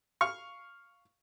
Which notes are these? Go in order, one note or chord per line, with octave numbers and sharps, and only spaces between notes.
F5 C#6